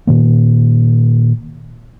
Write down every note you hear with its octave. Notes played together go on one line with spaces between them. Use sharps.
A#2 D#3 A#3